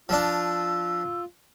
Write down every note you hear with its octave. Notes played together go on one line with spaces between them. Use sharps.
F3 D4 F4 E6